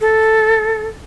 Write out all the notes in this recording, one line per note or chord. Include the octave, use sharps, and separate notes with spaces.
A4